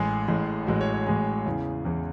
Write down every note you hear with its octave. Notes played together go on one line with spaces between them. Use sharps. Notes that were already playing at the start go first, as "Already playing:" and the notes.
Already playing: A1 A2 G#3 G#4
A1 A2 G#3
A1 A2 G#3 F#4
C#5
C#5
A1 A2 G#3 G#4
E2 C#3 E3
E2 C#3 E3